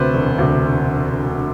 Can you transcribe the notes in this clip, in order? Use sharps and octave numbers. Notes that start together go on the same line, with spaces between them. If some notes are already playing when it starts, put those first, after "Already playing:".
Already playing: D2 C3 B4 C5
E1
D2 C3